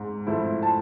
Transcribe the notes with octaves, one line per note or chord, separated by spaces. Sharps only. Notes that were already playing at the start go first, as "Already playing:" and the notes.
Already playing: G#2
F3 A3 E4
A5